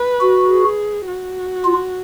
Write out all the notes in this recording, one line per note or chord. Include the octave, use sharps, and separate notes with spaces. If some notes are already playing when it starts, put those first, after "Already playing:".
Already playing: B4
F#4
G#4
F#4
F4